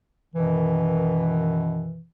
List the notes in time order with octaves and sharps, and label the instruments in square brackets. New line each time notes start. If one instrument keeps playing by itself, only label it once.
[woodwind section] F#2 B2 D#3 E3